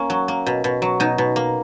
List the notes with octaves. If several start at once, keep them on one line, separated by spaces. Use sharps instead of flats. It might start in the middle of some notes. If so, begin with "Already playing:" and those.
Already playing: A#3 C#4
F#3
A#3
B2
B2
F#3
B2 D#4
B2
A#3